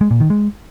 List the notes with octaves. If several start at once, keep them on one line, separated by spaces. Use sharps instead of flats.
G#3
A#2
D#3
G#3